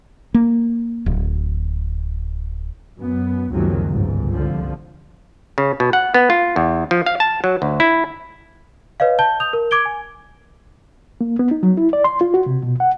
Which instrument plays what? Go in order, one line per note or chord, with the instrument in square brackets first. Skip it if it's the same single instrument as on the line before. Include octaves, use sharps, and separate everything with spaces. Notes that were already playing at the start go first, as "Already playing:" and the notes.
[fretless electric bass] A#3
D1
[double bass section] F#2 B3
F#1 C#2 C3 D#3 F3 F#3
G1 C#2 G#2
C2 D3 F3
[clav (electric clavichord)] C#3
B2
F#5
B3
F4
E2
F3
F5
A5
F#3
D2
E4
[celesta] B4 C#5 D#5 F5
A5 G6 G7
D#6 G6 F7
A#4
D6 G#6 D7 G7
G#5
[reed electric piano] A#3
B3
D#4
F#3
E4
D5
C6
F4
F#4
C3
B2
F#5